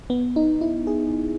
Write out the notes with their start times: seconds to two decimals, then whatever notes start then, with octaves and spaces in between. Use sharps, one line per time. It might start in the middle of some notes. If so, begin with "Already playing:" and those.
0.10 B3
0.36 D#4
0.61 E4
0.87 G#4